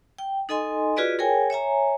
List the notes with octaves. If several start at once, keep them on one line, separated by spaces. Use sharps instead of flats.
G5
D#4 A4 D#5 G#5 C6
F4 F#4 G#4 B4 D5 D#5
G#4 A#4 C#5 G5 G#5
C#5 E5 G#5 A#5